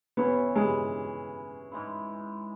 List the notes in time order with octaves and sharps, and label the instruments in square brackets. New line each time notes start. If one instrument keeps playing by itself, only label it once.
[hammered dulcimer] E3 C#4 E4 [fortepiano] B3
[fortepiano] G#3
[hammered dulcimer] G#2 G#3 E4